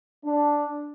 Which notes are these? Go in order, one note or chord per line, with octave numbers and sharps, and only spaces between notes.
D4